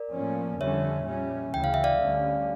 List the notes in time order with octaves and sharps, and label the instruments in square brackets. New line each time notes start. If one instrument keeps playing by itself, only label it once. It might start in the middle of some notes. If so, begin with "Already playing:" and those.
Already playing: [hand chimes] A#4 D5
[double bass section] A2 F3 A#3 C#4
[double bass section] F2 D3 G3 C#4 [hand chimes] C#5 E5
[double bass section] A#2 G3 C#4
[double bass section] D2 C#3 E3 [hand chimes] G5
[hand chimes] F5
E5
D5 F5
[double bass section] D2 D3 G3 C#4